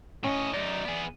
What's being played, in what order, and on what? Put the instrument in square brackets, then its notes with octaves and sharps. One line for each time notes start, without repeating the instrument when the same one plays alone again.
[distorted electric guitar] A2 D#5 [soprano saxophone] C#4
[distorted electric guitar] F#2 D#4 [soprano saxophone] D5
[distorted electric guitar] B3 G#4